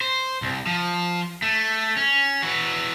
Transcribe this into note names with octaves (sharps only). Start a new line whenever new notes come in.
C5
C2
F3
A3
C#4
E3 F#4